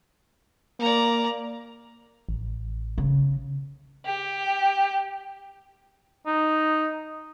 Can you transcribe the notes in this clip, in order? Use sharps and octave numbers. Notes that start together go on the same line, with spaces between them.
A#3 D5 A#5
A1
C#3
G4
D#4